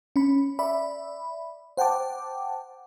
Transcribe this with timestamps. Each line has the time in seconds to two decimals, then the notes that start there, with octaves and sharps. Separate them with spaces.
0.16 C#4 B5
0.59 D5 E5 B5
1.77 C5 F#5 G5 A5 D6